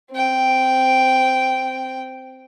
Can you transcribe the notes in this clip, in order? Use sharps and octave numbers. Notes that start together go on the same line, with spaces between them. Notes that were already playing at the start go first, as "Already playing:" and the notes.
C4 G5